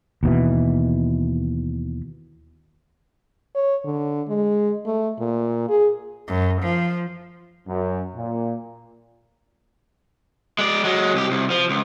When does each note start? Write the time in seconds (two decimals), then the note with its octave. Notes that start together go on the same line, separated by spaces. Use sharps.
0.23 D#2 B2 E3
3.55 C#5
3.84 D3
4.28 G#3
4.86 A3
5.19 A#2
5.69 G#4
6.28 F#2
6.62 F3
7.68 F#2
8.15 A#2
10.59 G#3 D5
10.85 F#3 G#3
11.14 C2 G4
11.31 C2
11.51 F3
11.69 C#2